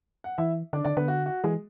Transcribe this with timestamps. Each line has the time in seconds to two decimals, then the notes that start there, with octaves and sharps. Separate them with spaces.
0.24 F#5
0.38 E3 E4 E5
0.73 D3 D4 D5
0.85 D3 D4 D5
0.96 D3 B3 B4
1.08 F#4
1.26 F#4
1.44 E3 G#3 G#4